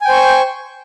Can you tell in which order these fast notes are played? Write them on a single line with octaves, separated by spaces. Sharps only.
G#5 G5 C5 C#6